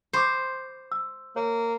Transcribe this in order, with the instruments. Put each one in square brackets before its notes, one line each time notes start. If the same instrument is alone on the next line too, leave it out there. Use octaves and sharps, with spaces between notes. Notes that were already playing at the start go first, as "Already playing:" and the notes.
[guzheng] C5 [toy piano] B5 C#6 D6
[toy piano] E6
[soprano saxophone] A#3 [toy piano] C#5